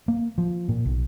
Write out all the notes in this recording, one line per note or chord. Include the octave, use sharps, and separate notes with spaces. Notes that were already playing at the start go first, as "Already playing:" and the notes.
A#3
F3
A#2
B1